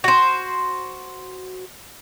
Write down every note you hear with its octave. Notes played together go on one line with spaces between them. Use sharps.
F#4 C5